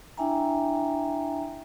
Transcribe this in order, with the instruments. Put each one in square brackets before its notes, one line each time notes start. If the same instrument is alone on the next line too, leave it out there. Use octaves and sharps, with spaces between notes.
[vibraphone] D4 E4 E5 G5 G#5 A#5